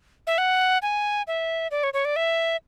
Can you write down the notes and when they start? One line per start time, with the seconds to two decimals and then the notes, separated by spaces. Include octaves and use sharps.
0.27 E5
0.38 F#5
0.82 G#5
1.27 E5
1.71 D5
1.83 C#5
1.94 C#5
2.05 D5
2.16 E5